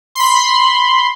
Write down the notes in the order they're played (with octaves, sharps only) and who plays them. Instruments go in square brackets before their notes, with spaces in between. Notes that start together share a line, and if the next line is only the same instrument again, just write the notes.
[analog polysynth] B5 C6